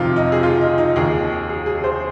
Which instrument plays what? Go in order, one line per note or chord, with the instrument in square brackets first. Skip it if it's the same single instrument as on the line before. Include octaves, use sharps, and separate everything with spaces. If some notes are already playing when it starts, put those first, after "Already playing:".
Already playing: [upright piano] F2 C3 D#3 F4
D#4
G#4
F4
D#4
D#4
D#2 D#3 G#4
G#4
G#4
C5